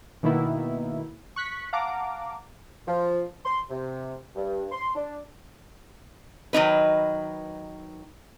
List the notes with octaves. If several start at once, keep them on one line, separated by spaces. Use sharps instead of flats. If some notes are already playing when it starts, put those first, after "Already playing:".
B2 D#3 A#3 B3 E4
C#6 F#6 B6
F5 F#5 A5 A#5 D6
F3
C6
C3
G2
C6
D4
D#3 F#3 D#4 B4